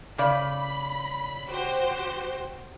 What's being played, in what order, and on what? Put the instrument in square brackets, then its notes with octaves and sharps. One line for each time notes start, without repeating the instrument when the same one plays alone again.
[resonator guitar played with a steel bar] C#3 D5 [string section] B5
[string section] F#4 G4 C5